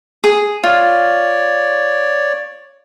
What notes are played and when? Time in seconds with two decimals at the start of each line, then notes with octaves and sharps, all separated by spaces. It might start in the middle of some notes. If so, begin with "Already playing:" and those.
0.24 G#4
0.64 F4 C#5 D5